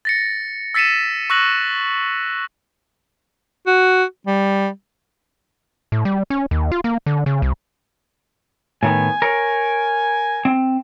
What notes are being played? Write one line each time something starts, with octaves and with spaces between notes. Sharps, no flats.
A6 A#6 C#7
E6 A6 B6 C#7 D#7 E7
C#6 E6 F#6 A#6 F#7
F#4
G3
A2
G3
C#4
D#2
F4
A#3
D3
C#3
C2
A2 D#3 B3 G#5
A#4 C#5
C4